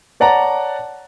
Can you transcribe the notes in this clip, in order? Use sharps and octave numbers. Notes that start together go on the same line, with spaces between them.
C#5 D5 F#5 A5 A#5